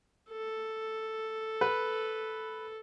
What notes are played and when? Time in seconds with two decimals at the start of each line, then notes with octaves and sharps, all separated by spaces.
0.31 A4
1.61 B4